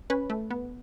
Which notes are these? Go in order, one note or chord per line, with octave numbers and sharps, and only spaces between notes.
C#4 B4
A3
B3